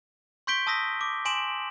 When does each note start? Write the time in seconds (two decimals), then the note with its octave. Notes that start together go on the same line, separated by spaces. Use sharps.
0.47 C6 C#6 G6 B6 D7 G7
0.67 A5 D#6 E6 A#6 B6
1.01 D6
1.25 G#5 C6 D7 E7 F#7